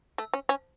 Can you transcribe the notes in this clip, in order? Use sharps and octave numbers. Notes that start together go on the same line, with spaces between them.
A3
C#4
C#4